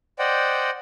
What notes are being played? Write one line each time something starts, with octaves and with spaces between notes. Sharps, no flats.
C5 D5 D#5 F#5 G5